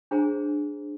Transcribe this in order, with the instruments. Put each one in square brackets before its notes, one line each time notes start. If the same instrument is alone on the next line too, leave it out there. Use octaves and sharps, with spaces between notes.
[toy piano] D4 G#4 C5 G#5 A#5